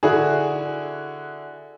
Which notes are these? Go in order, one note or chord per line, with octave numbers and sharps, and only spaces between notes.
D3 E4 F#4 G#4